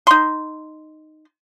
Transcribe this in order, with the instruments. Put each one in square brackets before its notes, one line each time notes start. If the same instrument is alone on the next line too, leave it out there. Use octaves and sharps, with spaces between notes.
[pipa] D#4 C6